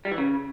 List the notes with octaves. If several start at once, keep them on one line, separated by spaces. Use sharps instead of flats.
G3
E3
C#3